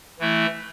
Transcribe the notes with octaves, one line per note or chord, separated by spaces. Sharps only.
E3 A3 E4